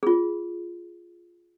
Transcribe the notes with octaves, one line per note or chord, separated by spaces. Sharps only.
F4 G#4